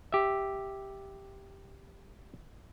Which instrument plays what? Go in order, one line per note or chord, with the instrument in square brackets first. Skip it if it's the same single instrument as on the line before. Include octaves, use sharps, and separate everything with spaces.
[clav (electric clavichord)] G4 E5